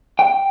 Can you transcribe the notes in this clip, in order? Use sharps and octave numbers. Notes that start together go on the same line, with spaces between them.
G5